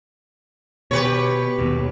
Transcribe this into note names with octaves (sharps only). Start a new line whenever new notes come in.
B2 G4 B4 C#5
D#2 B2